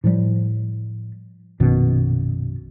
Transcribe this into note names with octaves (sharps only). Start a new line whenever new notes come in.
A2 F3 G3
A#1 F#2 B2 D#3